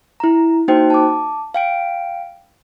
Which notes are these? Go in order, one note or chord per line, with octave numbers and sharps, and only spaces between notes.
E4 A#5
A#3 D#4 F#4 C5 G5
A5 D6
F5 G5 D7